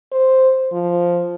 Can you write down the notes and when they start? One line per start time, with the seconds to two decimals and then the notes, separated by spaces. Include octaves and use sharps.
0.12 C5
0.72 F3